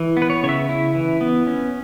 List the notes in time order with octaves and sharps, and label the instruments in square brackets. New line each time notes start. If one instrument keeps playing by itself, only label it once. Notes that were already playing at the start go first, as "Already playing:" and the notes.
Already playing: [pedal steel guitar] E3
B3
B4
C#5
C#3 C#5
E5
E4
E3
B3
C#4